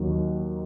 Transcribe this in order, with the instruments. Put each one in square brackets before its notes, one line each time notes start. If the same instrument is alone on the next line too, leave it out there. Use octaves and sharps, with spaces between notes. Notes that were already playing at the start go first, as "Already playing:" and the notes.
Already playing: [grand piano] D#2 D#3 F#3